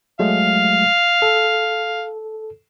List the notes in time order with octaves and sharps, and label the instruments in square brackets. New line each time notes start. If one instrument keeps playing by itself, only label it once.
[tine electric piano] F#3 G#3 A3 [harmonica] F5
[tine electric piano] A4